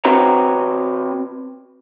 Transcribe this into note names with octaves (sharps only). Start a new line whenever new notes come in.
C4 F#4 B4 C#5 A#5